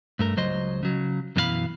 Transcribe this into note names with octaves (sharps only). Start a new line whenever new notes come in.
G2 A3 A#4
C#2 F#3 C5 D#5 C6
C#3 F#3
F#2 B2 E3 E4 F5 B5